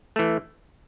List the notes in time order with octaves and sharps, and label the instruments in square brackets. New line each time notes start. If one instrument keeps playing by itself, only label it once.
[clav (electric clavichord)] E3 A3